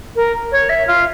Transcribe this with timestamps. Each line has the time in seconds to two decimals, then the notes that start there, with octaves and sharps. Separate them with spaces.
0.15 A#4
0.51 C#5
0.69 E5
0.87 F4